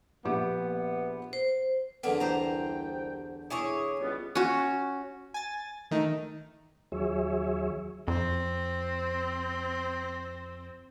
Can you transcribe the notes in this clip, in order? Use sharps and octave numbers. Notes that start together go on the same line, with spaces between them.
A#1 B3 G4 D6
C5
E2 D3 A#3 B3
C2 C5 G5 A#5
E4 G#4 C#5 D6 D#6
C#2 G3 B3
C#4 F#4
G#5 A6
D#3 A3 D#4
D#2 F#3 G#4 C#5 E5
F2 C4